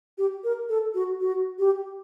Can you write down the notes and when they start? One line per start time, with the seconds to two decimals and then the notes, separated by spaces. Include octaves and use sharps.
0.18 G4
0.44 A#4
0.69 A4
0.94 F#4
1.21 F#4
1.59 G4